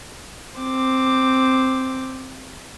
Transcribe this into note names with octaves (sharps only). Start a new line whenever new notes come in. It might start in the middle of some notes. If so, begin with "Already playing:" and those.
C4 D6